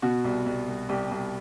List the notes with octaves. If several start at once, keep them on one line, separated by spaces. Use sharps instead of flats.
B2 F#4
C2
C2
C2
C2 G4
C2